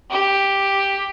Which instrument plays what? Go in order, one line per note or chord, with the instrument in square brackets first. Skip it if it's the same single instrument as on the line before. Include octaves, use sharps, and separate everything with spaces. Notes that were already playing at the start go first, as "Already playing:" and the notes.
[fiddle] G4